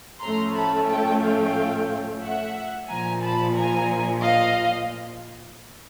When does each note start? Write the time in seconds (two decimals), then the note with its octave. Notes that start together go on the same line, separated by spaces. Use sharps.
0.22 A2 F3 A3 C#4 A#5 C6
0.55 A5 B5
0.88 G5 A5
1.22 F5 G5
2.22 E5 F#5
2.88 A#1 A#2 F3 G#5 A#5
3.22 A5 B5
3.56 G#5 A#5
4.22 D#5 F5